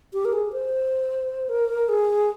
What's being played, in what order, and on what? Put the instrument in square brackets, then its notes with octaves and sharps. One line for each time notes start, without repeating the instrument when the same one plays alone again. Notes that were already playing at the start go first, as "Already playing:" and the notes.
[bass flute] G4
A#4
G#4
C5
A#4
G#4